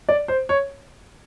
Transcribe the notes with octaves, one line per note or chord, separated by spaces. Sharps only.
D5
C5
C#5